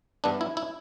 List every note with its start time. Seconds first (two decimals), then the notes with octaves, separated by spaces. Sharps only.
0.24 G2 E3 B3 D4
0.41 E4
0.57 E4